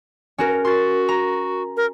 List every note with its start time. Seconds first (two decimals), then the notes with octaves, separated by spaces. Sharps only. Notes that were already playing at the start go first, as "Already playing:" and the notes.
0.38 C#4 F#4 A#4
0.65 F#4 C6 A6
1.09 A#5
1.77 A#4